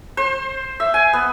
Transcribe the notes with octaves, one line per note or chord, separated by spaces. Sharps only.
C5
E5
G#5
B3